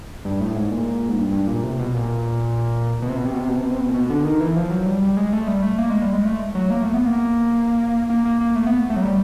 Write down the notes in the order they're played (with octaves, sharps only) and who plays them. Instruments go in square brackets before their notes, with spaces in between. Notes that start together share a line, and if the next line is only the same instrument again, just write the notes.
[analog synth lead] G2
A2
G#2
A#2
G#2
G2
G2
A#2
C3
B2
A#2
B2
C3
B2
C3
B2
C3
B2
C3
B2
C3
B2
A#2
B2
D3
D#3
E3
F3
F#3
G3
G3
G#3
A3
G3
A3
A#3
G#3
G3
G#3
A3
F#3
A#3
A3
B3
A#3
A#3
A#3
A#3
A3
B3
A3
F#3
G3